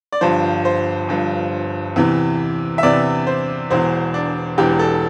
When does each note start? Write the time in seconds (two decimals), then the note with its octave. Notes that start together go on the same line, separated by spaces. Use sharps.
0.12 D5
0.21 G1 G2 F3 C5
0.65 C5
1.09 G1 G2 F3
1.96 E2 C3 E3
2.78 E5
2.83 E2 C3 E3 D5
3.27 C5
3.70 E1 E2 E3 C5
4.14 D4
4.58 E1 E2 E3 G4
4.79 A4